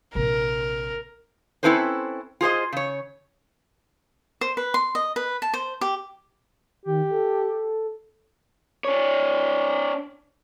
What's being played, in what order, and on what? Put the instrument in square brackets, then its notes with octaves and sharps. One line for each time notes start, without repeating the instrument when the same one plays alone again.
[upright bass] A#1 C3 [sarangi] A#4
[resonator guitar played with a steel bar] C4 C#4 E4 A4 B4 C5
F4 G#4 C5 D#5
C#3 C#5
[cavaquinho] C5
B4
C6
D#5
B4
A5
C5
G4
[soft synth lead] D#3 [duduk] G4
[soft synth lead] A4
[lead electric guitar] D4 C#5